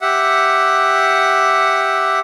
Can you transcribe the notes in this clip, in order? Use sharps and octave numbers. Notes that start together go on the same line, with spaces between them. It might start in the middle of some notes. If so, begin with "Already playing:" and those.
G4 E5 F#5